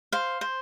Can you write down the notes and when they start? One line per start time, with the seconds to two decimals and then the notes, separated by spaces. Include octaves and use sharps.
0.12 C5 F5
0.41 C5